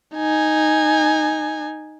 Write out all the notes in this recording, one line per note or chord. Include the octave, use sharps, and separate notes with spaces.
D#4 G#5